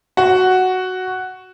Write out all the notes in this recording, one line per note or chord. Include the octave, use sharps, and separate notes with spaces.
F#4